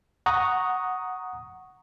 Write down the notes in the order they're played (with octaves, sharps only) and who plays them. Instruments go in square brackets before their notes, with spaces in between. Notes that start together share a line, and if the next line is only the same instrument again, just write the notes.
[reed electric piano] F#5 A#5 C#6 D#6